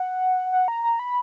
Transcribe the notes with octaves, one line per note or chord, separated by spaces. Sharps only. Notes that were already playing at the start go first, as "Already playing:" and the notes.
Already playing: F#5
F#5
A#5
A#5
B5